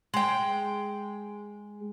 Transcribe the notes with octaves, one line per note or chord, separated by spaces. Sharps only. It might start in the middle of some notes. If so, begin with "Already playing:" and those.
G#3 G5